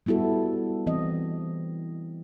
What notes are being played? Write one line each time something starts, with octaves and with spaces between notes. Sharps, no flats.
G3 B3 E4 F#4 A4
E3 C4 D#5